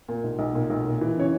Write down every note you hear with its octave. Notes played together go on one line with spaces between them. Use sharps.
A#2
B1
B1
A#2
B1
A#2
E3
C#3 C#5